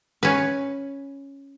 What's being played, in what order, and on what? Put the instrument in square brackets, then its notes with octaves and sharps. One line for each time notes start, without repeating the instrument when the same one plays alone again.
[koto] C#4 B4